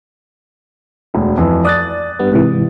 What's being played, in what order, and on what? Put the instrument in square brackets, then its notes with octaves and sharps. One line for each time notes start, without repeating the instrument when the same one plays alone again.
[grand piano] E1 D2
F2 E3 F3
[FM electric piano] D5 [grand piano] D#6 F#6 A6
[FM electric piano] G2 G3 B3
G#2 C3 E3